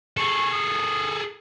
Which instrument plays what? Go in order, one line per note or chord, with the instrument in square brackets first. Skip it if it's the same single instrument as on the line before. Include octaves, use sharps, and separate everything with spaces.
[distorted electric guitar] G#4 A4 [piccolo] C#6
[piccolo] D#6